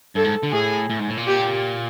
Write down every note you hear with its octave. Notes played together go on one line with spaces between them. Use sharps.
G2 A4
G#2
D3
A2 G#4
A2
G#2
A2
A#2
G4